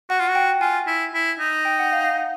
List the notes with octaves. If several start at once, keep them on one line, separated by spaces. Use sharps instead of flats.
F#4 F#5
F4
F#4
G5
F4 G#5
E4
E4
D#4
G5
F#5
F5
F5
F#5